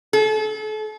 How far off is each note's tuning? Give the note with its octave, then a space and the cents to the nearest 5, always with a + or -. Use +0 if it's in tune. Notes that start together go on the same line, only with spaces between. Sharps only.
A4 -35